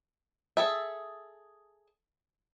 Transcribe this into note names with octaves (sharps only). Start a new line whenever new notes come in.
G#4 A4 E5